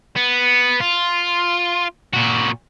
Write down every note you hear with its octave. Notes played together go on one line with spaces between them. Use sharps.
B3
F4
A#2 F#4